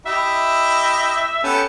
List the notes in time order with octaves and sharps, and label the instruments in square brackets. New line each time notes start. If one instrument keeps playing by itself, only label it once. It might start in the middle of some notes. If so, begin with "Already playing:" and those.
[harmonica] E4 G4 D#5 [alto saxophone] E5
[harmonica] B3 G4 A4 [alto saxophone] C#4